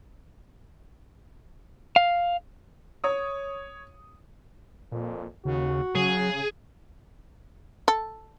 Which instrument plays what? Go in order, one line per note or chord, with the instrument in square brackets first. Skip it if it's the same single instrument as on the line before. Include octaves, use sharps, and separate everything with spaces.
[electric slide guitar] F5
[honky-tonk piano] C#5 D#6
[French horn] F2 [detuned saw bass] A#2
[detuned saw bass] D#2 [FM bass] C#3 [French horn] F#4
[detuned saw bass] C#3 [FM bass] F#3 [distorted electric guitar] G#4
[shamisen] A4